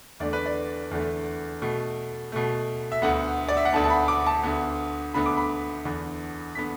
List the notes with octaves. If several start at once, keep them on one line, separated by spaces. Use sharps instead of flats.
E2 D3 A3 D5
B4
D5
E2 D3 A3
B2 A3
B2 A3
E5
D2 D3 B3 F#5
D5
E5
F#5
D2 D3 B3 A5
A5
B5
D6
A5
D2 D3 B3
D2 D3 B3 B5
D6
B5
E2 D3 B3
D3 B3 B6